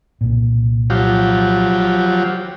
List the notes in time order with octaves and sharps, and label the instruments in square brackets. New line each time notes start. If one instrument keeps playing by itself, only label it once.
[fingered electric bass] C2 A#2
[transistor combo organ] F3 F#3 G4